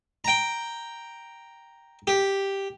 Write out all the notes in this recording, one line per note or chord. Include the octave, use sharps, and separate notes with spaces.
G5 A#5
G4